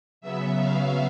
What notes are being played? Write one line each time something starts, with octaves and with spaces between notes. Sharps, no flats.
C#3 F#3 B3 E5
F5